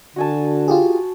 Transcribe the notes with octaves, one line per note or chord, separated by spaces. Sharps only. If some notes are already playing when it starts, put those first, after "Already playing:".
D3 F#4 G#5 A5
F4 G4 G#4